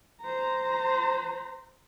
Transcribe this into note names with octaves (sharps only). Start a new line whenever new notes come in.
C5 A#5